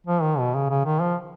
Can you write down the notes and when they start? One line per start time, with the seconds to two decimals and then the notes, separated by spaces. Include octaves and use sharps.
0.07 F3
0.22 D#3
0.39 B2
0.55 C#3
0.70 C#3
0.85 D#3
1.01 F3